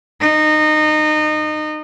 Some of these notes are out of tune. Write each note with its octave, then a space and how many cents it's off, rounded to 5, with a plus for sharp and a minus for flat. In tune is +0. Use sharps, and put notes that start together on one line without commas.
D#4 -25